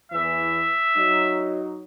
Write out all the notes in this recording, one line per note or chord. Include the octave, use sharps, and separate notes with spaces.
E2 E3 E5
F#3 D#4